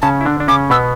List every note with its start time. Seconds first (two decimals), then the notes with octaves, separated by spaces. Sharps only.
0.02 C#3 C#4 A5
0.21 E4
0.25 D3 D4
0.40 D4
0.48 C#3 C#4 D6
0.70 B2 B3 E6